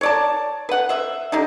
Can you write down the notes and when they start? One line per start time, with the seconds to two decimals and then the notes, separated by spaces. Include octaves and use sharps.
0.01 C#5 D5 A5
0.69 B4 F#5
0.89 C5 E5
1.32 D3 G3 D#4